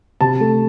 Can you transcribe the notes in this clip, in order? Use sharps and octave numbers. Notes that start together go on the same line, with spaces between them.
C3 A5
A3